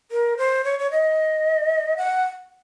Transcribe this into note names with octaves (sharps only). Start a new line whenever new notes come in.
A#4
C5
C#5
C#5
D#5
F#5